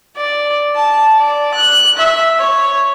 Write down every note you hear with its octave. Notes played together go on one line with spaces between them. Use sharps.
D5
A5
D5
F#6
E5
C#5